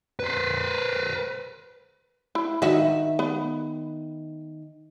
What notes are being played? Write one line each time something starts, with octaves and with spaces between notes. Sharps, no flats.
B4 C5
E4
D#3 F#4 D#5 E5
B3